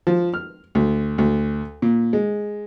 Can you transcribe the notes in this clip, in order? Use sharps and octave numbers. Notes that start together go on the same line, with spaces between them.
F3
F6
D2
D2
A#2
G#3